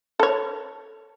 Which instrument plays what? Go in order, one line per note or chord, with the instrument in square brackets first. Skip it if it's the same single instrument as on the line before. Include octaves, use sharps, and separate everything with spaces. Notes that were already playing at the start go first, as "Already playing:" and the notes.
[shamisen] A4 C#5